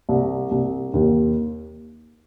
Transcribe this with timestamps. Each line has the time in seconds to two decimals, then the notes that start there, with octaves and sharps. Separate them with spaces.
0.09 C2
0.51 C2
0.93 D#2